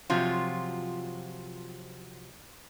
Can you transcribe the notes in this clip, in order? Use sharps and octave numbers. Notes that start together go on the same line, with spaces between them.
C3 F3 F#3 F4